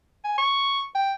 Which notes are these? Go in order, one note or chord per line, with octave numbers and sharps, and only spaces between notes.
G#5
C#6
G5